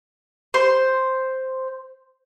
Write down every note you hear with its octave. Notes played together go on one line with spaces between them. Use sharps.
C5